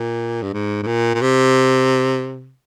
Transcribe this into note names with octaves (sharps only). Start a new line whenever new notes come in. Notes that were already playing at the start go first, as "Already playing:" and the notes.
Already playing: A#2
G2
G#2
G#2
A#2
A#2
C3